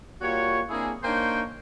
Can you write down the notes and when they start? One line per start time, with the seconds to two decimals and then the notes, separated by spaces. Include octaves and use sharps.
0.22 G3 A#3 F4 F#4 C#5
0.70 A#3 C4 D4 E4 G#4
1.04 A#3 D4 D#4 C5 C#5 G5